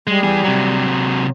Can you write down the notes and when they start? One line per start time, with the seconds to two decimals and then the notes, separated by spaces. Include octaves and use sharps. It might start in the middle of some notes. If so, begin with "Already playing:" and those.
0.07 G3 G#3
0.24 E3 G#4
0.44 C3 F#3